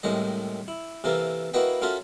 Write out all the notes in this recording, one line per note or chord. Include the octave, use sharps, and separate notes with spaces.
C2 A2 D#3 G#3 D#5
E4
C3 E3 A#3 A4 A#4
A#3 E4 F#4 B4 D#5 G5
C#4 F4 F#4 A4 A#4 E5